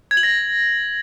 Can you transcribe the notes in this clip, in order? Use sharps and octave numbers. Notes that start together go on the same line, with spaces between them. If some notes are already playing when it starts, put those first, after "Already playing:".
G#6
F#7
A#6